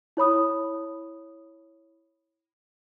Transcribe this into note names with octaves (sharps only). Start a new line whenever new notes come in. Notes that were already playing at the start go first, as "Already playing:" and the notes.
E4 C#5 B5 D#6